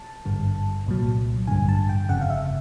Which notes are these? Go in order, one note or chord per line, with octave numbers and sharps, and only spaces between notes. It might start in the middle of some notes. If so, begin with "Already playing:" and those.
Already playing: A5
G#1 G2 D3
C2 A#2 F#3
A1 G2 D3 G#5
A5
G5
G1 F2 C#3 F#5
F5
E5